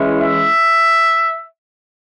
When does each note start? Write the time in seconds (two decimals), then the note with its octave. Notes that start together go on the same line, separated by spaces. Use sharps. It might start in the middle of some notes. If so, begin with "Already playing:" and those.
Already playing: E3 G#3 C#4 E4
0.20 E5